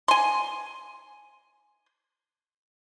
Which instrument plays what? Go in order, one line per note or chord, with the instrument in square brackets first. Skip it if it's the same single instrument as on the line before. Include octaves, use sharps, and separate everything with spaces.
[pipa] G#5 C6